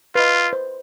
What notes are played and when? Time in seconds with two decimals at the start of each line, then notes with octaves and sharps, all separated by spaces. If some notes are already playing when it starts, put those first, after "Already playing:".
0.15 F4 B4 D#5
0.53 C5